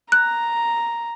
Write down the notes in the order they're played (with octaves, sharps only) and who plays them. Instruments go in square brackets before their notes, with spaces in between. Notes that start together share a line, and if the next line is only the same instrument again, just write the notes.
[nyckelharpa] A#5 [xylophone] F#6